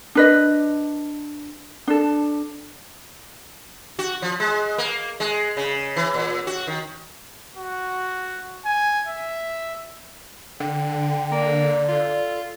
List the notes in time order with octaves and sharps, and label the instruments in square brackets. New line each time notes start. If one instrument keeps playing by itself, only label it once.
[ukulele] D4 B4 D#5
D4 A4
[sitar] F#4
F3
G#3
A#3
G#3
C#3
E3
A#2
F#4
D#3
[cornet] F#4
G#5
E5
[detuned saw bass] D3 [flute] G5
[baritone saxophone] A#3 [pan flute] D5
[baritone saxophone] F4 [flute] A4